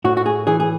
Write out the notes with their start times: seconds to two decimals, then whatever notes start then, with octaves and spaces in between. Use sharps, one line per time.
0.04 A2 F#4
0.17 F#4
0.26 G#4
0.47 E3 G#4
0.60 G#4